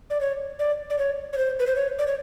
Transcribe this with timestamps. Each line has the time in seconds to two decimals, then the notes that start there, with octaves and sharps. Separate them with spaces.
0.10 D5
0.21 C#5
0.59 D5
0.90 D5
0.99 C#5
1.33 C#5
1.38 C5
1.60 B4
1.67 C5
1.76 C#5
1.99 D5
2.07 C#5